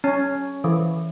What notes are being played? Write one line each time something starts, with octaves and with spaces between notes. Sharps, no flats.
C#4
E3